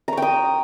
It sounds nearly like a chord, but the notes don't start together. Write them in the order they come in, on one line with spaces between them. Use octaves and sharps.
A#5 C#6 G5 D#6